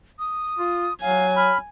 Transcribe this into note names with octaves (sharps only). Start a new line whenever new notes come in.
D#6
F4
F#3 F5 G#5
B5 F6